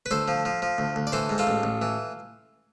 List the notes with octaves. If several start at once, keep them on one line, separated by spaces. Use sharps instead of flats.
B4
D2 A4 C5
F3
F3
F3
D2
D2
D5
E3 A4 C5
G#2
F4 A4
A1
A1
E3